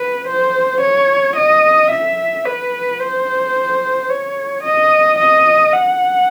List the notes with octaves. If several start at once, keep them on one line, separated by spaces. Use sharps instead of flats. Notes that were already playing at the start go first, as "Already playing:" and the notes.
Already playing: B4
C5
C#5
D#5
E5
B4
C5
C#5
D#5
D#5
F#5